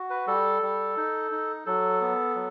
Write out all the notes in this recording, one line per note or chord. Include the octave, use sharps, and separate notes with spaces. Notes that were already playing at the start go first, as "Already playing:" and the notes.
Already playing: F#4
B4
G3 A4
G3
D#4
D#4
F#3 A4
B3
F#3